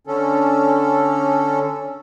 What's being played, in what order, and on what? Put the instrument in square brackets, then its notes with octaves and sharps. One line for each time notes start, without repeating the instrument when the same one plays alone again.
[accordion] D3 C#4 A4